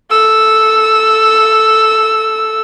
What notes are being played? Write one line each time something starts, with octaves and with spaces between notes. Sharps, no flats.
A4 E6